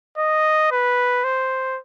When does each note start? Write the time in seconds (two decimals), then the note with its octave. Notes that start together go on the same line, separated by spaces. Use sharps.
0.18 D#5
0.72 B4
1.24 C5